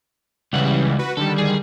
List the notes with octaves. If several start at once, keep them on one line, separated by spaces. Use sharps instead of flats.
C#2 C#3 E3 G3 F#5
F#4 B4
D3 D#3 G3 A4
G#4